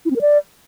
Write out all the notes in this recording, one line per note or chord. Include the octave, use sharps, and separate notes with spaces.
E4
C4
A#4
D5